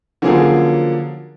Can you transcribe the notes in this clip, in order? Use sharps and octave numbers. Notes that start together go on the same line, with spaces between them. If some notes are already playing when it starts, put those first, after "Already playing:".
D3 F3 F#3 A#3 C#4 G#4